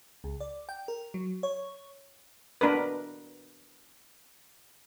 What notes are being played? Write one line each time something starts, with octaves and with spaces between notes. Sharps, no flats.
C#2
D5
G5
A#4
F#3
C#5
B3 D4 A#4 B4